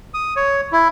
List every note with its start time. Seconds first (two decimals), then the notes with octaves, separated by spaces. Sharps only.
0.14 D#6
0.36 C#5
0.72 E4